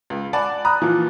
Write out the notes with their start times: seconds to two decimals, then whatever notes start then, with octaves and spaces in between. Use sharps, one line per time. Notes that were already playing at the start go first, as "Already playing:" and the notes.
0.10 C#2
0.33 D5 F#5 G#5 A5 B5
0.65 A#5 B5 D#6 F#6
0.81 A#2 E3 F3